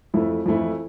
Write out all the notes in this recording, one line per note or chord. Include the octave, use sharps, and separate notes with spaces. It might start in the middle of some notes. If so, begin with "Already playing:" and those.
F2 E3 A3 E4
F2 E3 A3 E4